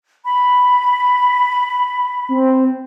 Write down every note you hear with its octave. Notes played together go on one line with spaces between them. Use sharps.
B5
C4